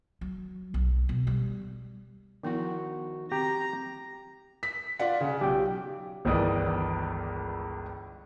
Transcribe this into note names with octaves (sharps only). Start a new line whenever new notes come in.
F#3
B1
B2
G3
D#3 F3 B3 E4 F#4
C4 G4 A#5
B6
F4 D5 F#5
C#3
B1 G4 G5
G1 C#2 D#3 E3 D5 D#6